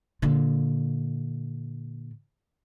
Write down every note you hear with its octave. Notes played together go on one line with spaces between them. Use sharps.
A#2 D3